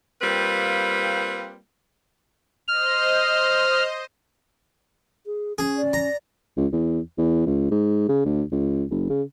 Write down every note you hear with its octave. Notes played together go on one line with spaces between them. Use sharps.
G3 A#3 C4 F4 B4
C5 D#5 F6
G#4
C#4 G#4
D5
A#5
C#2
E2
E2
C#2
G#2
C#3
D2
C#2
F#1
C#3